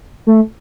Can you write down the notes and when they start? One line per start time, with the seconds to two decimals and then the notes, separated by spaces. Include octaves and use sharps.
0.27 A3